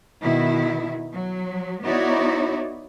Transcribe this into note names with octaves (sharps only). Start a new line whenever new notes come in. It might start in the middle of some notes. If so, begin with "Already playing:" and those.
B2 D#3 E4
F#3
B3 D#4 E4 F#4 C#5 D5